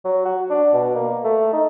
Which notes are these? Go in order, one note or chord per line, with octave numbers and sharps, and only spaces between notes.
F#3
F#4
D4
B2
A#3
A3
D#4